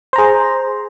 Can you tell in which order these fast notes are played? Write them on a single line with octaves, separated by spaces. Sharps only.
C5 A#5 G#4